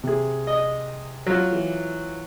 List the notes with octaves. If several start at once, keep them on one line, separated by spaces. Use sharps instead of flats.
C3 G#4
D#5
F#3 F4
E3